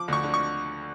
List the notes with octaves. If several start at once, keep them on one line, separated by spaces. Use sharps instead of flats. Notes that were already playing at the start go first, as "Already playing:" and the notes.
Already playing: F3 D6
D2 C#6
D3
C#6